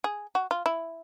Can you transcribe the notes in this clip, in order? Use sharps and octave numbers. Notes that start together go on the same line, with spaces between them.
G#4
F#4
F4
E4